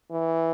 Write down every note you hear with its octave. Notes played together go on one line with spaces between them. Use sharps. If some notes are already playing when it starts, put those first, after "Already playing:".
E3